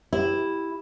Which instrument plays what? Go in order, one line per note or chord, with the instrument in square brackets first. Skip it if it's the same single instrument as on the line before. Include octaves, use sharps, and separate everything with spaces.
[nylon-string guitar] E4 [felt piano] G4